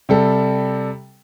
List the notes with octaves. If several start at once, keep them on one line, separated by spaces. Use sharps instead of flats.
C3 G3 A4